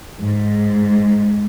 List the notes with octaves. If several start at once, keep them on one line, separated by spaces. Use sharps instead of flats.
G#2